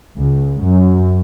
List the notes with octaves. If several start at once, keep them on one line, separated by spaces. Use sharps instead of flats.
C#2
F#2